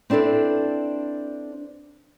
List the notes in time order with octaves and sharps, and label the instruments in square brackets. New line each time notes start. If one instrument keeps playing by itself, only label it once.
[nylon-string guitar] C4 D4 E4 A4 B4